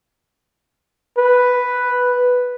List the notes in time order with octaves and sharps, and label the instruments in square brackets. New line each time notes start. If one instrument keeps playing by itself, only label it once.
[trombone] B4